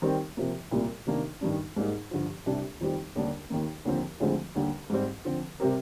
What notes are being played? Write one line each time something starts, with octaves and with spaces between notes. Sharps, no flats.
D#3 G3 C4 G4 A#4
C3 F3 A#3
C2 A#2 G3 A#3
C3 D#3 A#3 D4
G2 D#3 G3 D4
G#2 G3 A#3 D#4 G#4
G2 D3 F3
C2 C3 G3 D4
F2 D#3 G3 C4 G4
D#2 D3 G3 D4
D#2 D#3 A#3
D#2 D3 F3 C4
D2 D3 F3 G#3 C4
D#2 D3 G3 D4
G#2 G3 C4
D3 F3 C4
C3 G3 C4 G4 A#4